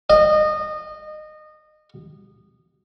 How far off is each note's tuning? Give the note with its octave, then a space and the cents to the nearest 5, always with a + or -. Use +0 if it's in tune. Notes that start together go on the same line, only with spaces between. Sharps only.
D#5 -25